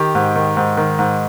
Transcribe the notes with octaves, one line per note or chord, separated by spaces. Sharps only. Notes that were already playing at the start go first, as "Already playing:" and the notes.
Already playing: D#3 G4
G#2
D#3
G#2
D#3
G#2